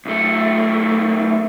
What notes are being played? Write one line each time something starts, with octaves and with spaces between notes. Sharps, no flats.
B1 A3